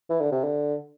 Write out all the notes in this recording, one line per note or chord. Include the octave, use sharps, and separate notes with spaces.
E3
D3
C3
D3